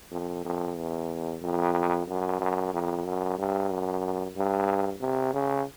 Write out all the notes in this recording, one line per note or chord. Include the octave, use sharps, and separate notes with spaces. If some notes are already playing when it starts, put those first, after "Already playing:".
F2
F2
E2
F2
F#2
F#2
F2
F#2
G2
F#2
G2
C3
C#3